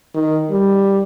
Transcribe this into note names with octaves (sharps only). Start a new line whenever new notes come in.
D#3
G3